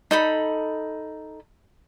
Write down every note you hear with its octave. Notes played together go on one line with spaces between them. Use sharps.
D#4 A4 B5